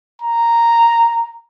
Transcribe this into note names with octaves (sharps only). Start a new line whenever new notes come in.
A#5